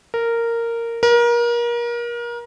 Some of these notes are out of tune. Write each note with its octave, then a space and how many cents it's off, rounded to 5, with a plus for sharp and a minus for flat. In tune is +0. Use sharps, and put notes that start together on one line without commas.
A#4 -10
A#4 +30